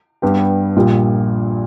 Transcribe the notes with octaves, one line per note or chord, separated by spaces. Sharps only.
G2 G3 B3 G4
A#1 A#2 G3